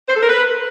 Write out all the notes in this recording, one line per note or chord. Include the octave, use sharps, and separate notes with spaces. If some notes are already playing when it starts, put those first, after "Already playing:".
C5
A4
A#4
B4